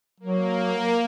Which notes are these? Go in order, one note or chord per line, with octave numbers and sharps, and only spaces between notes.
F#3 A#3